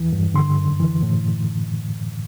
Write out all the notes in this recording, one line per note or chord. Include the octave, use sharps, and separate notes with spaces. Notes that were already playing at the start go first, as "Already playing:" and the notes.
Already playing: E2 E3
G2
D3 C6
F#2
E3
A2